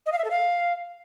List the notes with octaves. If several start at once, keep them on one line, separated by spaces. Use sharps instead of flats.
D#5
F5
E5
A4
F5